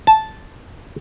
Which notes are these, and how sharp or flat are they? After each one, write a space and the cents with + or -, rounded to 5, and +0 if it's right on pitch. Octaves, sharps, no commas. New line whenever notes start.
A5 -5